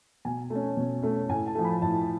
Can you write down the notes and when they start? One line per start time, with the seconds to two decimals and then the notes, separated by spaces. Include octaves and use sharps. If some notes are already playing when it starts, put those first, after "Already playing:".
0.25 B2 G#5
0.50 A3
0.55 C#4
0.77 B2
1.03 A3 C#4
1.29 A2 G#5
1.47 A5
1.55 F3 A3
1.64 B5
1.82 A2 A5